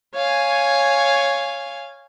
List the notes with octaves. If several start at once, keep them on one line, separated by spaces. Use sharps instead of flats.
C#5 F5 G#5